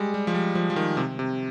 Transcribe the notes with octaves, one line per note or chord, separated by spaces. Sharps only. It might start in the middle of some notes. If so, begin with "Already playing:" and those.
Already playing: G3 G#3
G3
F3
G3
F3
F3
D#3
C3
C3